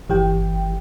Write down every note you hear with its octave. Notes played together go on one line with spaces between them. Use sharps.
G1 E3 G4 G5